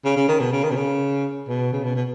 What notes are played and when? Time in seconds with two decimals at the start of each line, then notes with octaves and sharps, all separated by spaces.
0.05 C#3
0.17 C#3
0.28 D#3
0.40 B2
0.53 C#3
0.64 D#3
0.71 B2
0.76 C#3
1.48 B2
1.73 C#3
1.84 B2
1.96 B2